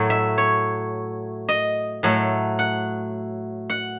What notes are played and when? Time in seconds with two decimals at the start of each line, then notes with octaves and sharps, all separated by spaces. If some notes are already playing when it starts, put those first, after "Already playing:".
Already playing: A2 F#3 A3
0.10 E5
0.38 C#5
1.49 D#5
2.03 A2 F#3 A3
2.59 F#5
3.70 F#5